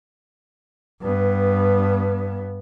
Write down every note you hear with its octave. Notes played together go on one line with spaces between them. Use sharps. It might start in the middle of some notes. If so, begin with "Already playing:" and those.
G2 B3